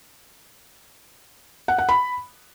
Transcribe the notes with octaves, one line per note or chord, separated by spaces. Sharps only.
F#5
F#5
B5